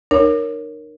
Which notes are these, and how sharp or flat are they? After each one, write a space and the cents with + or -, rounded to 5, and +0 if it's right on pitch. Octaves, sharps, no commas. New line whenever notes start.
D#4 -45 A#4 +0 C#5 +0